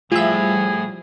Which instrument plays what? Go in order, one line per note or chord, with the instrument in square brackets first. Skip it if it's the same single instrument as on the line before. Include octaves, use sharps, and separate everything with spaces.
[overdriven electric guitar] A2 [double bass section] F3 G3 [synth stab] F4 E5 [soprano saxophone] G#4